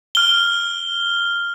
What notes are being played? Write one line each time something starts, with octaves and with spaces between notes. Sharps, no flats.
F6 G7